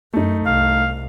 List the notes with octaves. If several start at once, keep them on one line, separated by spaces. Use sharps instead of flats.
F#2 A3 D#4
C2 F5